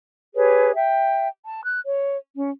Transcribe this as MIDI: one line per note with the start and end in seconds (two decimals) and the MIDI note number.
0.35 0.71 67
0.35 0.71 68
0.35 0.71 71
0.35 0.71 73
0.75 1.27 76
0.75 1.27 79
1.45 1.63 81
1.64 1.80 90
1.85 2.17 73
2.35 2.51 61